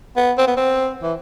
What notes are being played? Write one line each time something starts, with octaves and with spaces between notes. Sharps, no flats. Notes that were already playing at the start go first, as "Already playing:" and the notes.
B3
C4
B3
C4
E3